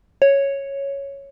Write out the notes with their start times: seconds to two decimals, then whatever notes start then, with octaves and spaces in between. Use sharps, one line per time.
0.22 C#5